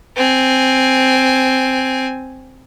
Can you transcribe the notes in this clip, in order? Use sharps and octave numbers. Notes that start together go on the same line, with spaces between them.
C4 G#5